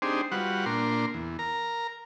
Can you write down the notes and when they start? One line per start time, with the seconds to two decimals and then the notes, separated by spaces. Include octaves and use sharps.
0.02 C4 D4 D#4 G4 G#4 C5
0.32 G3 F4 F#4 B4 F#5
0.66 A#2 D4 A#4 C6
1.14 E2
1.39 A#4 A#5